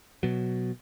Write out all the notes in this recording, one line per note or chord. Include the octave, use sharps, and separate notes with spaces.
B2 F#3